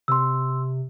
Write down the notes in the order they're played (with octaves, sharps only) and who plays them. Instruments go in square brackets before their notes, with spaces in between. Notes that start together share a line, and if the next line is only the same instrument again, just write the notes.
[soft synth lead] C3 [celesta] C6 E6